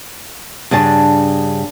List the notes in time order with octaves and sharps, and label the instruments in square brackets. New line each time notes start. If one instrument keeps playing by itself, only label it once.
[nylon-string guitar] G2 C#3 D4 A5